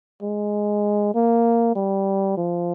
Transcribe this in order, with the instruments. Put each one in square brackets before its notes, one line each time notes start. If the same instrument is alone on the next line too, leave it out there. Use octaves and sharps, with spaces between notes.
[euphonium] G#3
A#3
G3
F3